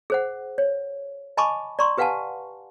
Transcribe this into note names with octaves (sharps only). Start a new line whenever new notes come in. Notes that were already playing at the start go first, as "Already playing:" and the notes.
G#4 C5 F#5
C#5
D#5 G#5 A5 B5 C#6 D6
D5 A#5 C6 C#6
G4 B4 F5 F#5 G#5 A5